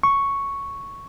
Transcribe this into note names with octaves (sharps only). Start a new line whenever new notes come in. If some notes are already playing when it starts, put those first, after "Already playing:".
C#6